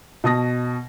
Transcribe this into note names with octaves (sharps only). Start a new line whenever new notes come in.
B2 A5 D#6 A#6